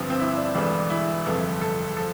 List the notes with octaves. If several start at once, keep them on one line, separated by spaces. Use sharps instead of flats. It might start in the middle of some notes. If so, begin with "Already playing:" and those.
Already playing: G1 G2 F3 C4
C4
E4
D4
E1 E2 D3 G3 D4
E4
G1 F2 C3 A4
A4
F3 A4